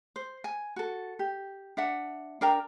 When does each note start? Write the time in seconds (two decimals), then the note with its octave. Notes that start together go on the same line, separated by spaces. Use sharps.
0.16 C5
0.44 G#5
0.76 F#4 A4
1.19 G4
1.77 D4 E5 F#5
2.41 D4 A#4 G5 A#5